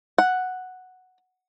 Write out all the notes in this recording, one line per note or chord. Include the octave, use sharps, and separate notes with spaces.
F#5